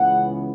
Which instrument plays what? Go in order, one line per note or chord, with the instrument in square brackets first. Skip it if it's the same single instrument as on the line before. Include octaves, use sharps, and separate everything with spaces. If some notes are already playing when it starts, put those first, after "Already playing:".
Already playing: [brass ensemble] C#2 C#3 E3 B3 F#5